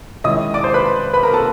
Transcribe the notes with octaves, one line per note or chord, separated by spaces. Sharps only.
D#3 G#3 C#4 E4 D#5 D#6
D5 D6
C5 C6
B4 B5
B4 B5
A#4 A#5
A4 A5